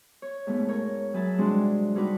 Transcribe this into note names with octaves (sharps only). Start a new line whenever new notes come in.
C#5
G#2 B2 A3
A#4 C#5
F#3 G#4 B4 E5 A5
G2 C3 G#3 D4 F#4 C6
G2 D#4 F#4 B4 D6